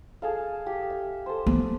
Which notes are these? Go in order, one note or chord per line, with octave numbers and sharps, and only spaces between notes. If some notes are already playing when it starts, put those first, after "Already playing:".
G#4 A4 F5
G4
E5
A4 C5
B3